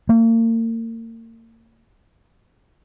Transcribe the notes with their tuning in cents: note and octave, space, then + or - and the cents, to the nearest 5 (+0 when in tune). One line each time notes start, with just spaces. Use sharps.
A#3 -40